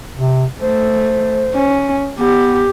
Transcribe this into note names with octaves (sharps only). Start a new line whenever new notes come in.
C3
A3 C5
C#4
B3 G4